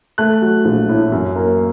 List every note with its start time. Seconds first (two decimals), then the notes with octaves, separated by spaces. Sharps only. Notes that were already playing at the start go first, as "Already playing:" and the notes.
0.18 A3 F#6
0.42 F#3
0.65 A#1
0.89 A2
1.12 F#2
1.36 A#3